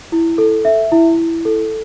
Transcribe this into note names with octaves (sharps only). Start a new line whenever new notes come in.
E4
A4
E5
E4
E4
A4